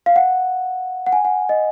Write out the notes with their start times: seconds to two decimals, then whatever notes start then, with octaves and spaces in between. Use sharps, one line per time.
0.06 F5
0.16 F#5
1.06 F#5
1.13 G#5
1.25 F#5
1.49 D#5